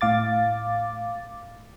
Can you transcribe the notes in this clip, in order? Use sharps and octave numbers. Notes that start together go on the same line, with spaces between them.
A2 F5 D6 A6